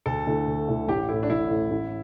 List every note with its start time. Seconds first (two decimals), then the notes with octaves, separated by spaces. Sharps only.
0.06 D2 A4
0.27 D3 A3 E4
0.47 D2
0.68 D3 A3 E4
0.88 A1 G4
1.09 A2 A3 E4
1.23 D4
1.30 A1 E4
1.50 A2 A3
1.71 A1